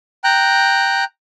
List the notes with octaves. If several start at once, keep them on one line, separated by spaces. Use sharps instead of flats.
G5 A#5 F#6